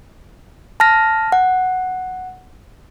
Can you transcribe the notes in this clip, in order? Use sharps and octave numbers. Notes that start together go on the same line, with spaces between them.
A5 F6 A#6
F#5